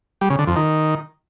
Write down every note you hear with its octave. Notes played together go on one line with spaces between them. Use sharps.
G3
C#3
D3
F2
D#3